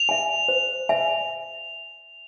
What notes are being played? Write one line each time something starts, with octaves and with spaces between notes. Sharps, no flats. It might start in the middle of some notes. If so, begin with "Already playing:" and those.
Already playing: F7
E5 G#5
C5
E5 G#5